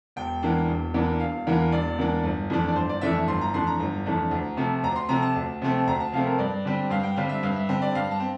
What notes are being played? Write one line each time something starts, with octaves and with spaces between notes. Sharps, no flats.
E1 G5
E2 E3 A#3 D4
E1
E2 E3 A#3 D4
E1 F5
E2 E3 A#3 D4
E1 D5
E2 E3 A#3 D4
G1
F2 E3 A3 D4
D5
G1 C5
D5
F2 E3 A3 D4 E5
E5
G1 C6
A#5
F2 E3 A3 D4 C6
A#5
G1
F2 E3 A3 D4
D2
C3 F3 A3 C4
D2 A#5
C6
C3 F3 A3 C4 A#5
A5
D2
C3 F3 A3 C4
D2 A#5
A5
C3 F3 A3 C4 F5
A#4
G2 D5
D3 G3 C4
G2 F5
G5
D3 G3 C4 F5
E5
G2 F5
E5
D3 G3 C4
D5
G2 F5
A5
C4